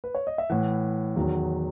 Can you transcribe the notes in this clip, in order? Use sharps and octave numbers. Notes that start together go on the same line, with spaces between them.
B4
C#5
D#5
E5
A2 E3 F#5
E2 D#3 F#3